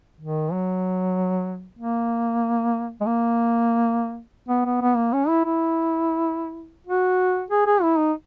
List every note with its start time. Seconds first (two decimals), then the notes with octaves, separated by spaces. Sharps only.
0.21 D#3
0.52 F#3
1.79 A#3
3.01 G#3
3.06 A#3
4.49 B3
4.65 B3
4.82 B3
4.97 A#3
5.13 C#4
5.28 E4
5.45 E4
6.87 F#4
7.51 G#4
7.67 G#4
7.82 E4
7.98 D#4